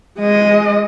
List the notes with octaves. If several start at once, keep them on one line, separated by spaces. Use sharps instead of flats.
G#3 D#5